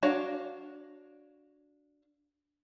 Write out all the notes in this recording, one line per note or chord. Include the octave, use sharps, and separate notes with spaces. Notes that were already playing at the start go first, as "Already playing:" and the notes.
D4 F#4 C#5 F5